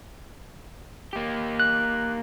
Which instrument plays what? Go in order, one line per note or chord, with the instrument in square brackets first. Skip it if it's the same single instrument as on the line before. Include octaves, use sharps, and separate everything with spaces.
[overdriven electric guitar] A#3 G4
[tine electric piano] F#6